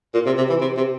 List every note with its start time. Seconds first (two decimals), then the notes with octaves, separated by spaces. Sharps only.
0.14 A#2
0.26 C3
0.37 C3
0.49 E3
0.61 C3
0.77 C3